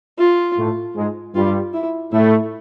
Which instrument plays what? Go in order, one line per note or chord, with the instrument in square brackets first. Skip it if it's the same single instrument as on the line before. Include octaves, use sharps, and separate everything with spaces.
[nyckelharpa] F4
[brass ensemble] A2 A3
G#2 G#3
[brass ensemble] G2 G3 [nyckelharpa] F4
[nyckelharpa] E4
[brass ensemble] A2 A3 [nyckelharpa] E4